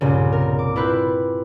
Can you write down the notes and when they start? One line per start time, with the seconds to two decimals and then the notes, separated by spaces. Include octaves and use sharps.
0.01 C2 G2 A#2 C#3
0.32 A#4
0.59 D6
0.76 E4 F4 G4 B4